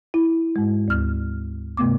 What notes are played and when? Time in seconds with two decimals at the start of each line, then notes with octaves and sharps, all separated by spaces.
0.14 E4
0.56 G#2 G#3
0.88 D2 F6
1.77 G2 C3 A3 B3 D6